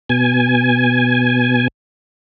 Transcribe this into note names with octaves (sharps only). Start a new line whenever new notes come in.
B2 G#5